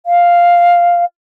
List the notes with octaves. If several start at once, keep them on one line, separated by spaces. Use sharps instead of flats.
F5